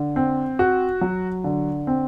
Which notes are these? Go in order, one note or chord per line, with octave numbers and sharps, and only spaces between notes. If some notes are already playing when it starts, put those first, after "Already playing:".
Already playing: D3
C4
F#4
F#3
D3
C4